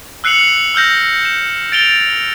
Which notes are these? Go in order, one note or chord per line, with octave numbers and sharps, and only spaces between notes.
E6 F#6 C7 C#7 F7 F#7
E6 F6 G6 A#6
E7
A6 D7 F7 G7